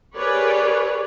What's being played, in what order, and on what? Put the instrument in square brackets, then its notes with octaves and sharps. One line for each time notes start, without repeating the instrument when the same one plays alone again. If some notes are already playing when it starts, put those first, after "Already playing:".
[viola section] G4 G#4 A#4 B4 C#5 D5